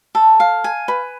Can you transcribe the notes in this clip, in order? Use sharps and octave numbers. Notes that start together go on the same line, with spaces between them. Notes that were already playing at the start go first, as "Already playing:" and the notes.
A4
F5
G#5
B4